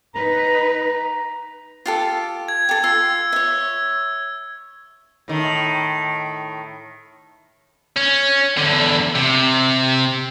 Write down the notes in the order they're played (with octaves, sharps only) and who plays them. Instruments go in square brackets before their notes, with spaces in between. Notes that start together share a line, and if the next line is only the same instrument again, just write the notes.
[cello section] D#4 B4 [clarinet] A#5
[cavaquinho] F4 G4 A4
[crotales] G#6
[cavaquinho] G4 A4
[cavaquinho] F4 [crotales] E6
[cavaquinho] C#5 E5
[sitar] A2 D#3
[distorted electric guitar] C#4
E2 D3
C3